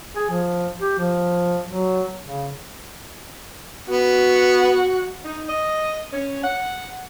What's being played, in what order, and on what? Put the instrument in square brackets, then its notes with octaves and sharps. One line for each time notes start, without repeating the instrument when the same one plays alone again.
[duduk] G#4
F3
G4
F3
F#3
C#3
[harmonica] B3 [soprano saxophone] F#4
[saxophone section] D#4
D#5
C#4
F#5